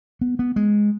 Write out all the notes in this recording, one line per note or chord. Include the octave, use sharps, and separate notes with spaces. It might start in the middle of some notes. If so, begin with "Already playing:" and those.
B3
B3
G#3